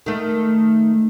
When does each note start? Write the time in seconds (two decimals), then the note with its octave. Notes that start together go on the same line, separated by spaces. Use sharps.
0.06 D#3 A3